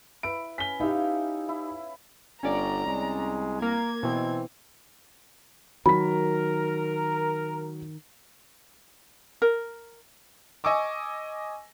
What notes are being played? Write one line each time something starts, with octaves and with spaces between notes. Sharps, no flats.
E4 B4 D7
C#4 B6 G7
D#4 E4 G4 E5 F5
E4
G1 C#4 D5 A#5
C2 G#3
A#3 A#4 G#6
B2 E3 C4
D#3 F#3 A#4 B5 B6
A#4
D#5 G#5 C#6 D6 E6